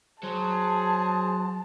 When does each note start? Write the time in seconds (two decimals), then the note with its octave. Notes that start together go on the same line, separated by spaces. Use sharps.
0.23 F#3 G#4 C5 A5